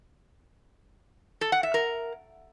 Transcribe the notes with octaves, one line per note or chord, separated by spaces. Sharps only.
A4
F#5
E5
A#4